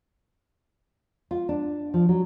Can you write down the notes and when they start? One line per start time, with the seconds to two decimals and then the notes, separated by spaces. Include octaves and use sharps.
1.31 F4
1.49 D4
1.94 F3
2.09 F#3